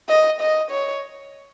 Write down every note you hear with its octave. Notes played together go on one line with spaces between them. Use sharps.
D#5
D#5
C#5